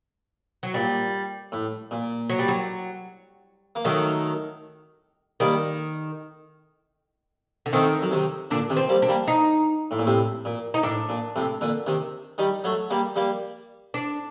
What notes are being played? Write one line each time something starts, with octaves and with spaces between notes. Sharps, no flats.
F#3
A#2 G3
A2
A#2
F#3
G3
F#3
A#3
D#3 F#3 A3
D#3 G3 A#3
D3
D#3 A3 C4
F#3
C3 D#3
A#2 D3 D4
C3 D#3
C4
G3 A#3
D4
G3 A#3
D#4
A2
A#2
A2 C3
A#2
D#4
A2 D4
A#2
A2 C3
A#2 D3
C3 D#3
D#3 G3
F#3 A3
G3 A#3
G3 A#3
D4